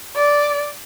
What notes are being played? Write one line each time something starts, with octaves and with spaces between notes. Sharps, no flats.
D5